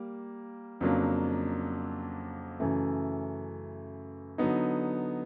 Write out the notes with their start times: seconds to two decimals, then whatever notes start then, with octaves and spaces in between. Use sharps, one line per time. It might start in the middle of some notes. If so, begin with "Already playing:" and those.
Already playing: G3 A#3
0.81 F2 C#3 F#3 A#3 D4
2.60 F#2 C#3 E3 A3
4.38 D3 F#3 B3 D#4